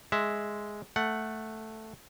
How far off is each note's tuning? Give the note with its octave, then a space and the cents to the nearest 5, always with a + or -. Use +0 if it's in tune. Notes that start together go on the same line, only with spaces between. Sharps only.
G#3 +0 E5 +0
A3 +0 F#5 +0